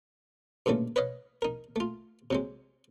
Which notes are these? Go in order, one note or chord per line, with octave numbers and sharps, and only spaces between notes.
G2 A#2 C#3 E3 A3
B4 C#5 D#5 F5
D#4 A#4
A3 F4
C3 F#3 G#3